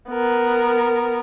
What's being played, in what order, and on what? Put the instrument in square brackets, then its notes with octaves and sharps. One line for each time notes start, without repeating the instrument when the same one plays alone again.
[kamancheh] B3 A#4